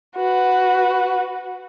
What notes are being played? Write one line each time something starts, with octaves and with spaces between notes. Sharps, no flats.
F#4 B4